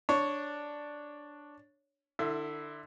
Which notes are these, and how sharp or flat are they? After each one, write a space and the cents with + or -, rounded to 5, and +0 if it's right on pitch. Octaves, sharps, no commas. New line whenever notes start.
D4 +0 C#5 +5
D3 +25 E4 +0 E5 +30